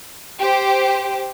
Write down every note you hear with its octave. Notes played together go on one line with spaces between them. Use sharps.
G4 C5